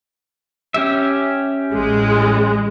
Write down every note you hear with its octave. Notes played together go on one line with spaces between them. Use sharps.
C#4 G4 E5
A1 G#3